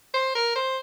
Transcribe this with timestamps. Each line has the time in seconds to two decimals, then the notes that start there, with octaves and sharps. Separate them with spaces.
0.14 C5
0.35 A#4
0.55 C5